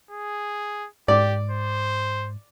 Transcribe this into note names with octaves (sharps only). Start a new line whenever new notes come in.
G#4
G#2 G4 D5
C5